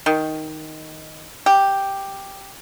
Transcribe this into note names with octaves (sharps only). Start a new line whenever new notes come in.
D#3
G4